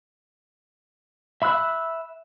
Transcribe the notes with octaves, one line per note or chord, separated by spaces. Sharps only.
E5 B5 E6 F#6